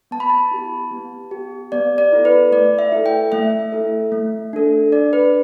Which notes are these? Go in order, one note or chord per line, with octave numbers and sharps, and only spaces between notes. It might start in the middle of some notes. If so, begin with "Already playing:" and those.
B3 A5
B5
A5
E4 G4
B3
G4
B3 D5
D5
E4 A4
B4
A3 D5
E5
E4 A4
G5
A3 E5
E4 A4
A3
D4 A4
D4 D5
B4